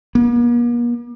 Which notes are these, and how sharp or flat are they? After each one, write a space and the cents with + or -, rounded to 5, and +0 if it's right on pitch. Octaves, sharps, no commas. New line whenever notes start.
A#3 +45